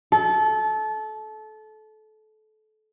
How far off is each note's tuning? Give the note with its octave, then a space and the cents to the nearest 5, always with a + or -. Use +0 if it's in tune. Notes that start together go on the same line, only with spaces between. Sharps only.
A4 -25